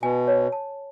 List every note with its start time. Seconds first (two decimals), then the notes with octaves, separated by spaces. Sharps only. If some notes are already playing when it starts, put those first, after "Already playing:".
0.03 B2 G#5
0.27 C#5
0.52 A5